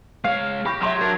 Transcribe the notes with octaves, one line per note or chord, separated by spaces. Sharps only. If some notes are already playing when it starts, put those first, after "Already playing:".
G#3 C#5 F5
G4 B5 C#6 A#6
F#3 E5 C6 A#6
D4 A#4